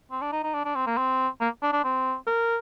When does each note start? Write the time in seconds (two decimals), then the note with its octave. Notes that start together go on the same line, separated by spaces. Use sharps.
0.11 C4
0.22 D4
0.32 D#4
0.44 D#4
0.54 D4
0.65 D4
0.75 C4
0.87 A#3
0.98 C4
1.41 A#3
1.62 D4
1.73 D4
1.84 C4
2.27 A#4